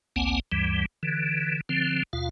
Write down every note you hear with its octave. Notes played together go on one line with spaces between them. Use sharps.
A1 D2 A#3 C4 F#5 G#5
D2 G2 E3 G3
D3 E3
D3 F3 C4
D#2 B2 F4 F5